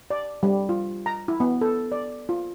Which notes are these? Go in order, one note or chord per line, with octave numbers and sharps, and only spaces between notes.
D5
G3
F4
A#5
E4
B3
A4
D5
F4